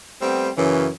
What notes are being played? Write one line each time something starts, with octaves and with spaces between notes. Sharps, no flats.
G3 A3 B3 C4
F#2 C#3 E3